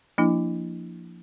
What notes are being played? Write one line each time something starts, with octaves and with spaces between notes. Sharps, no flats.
F3 A#3 D4 E4